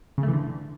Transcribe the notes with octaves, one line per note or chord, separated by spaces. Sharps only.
C#3
A3
E3
D3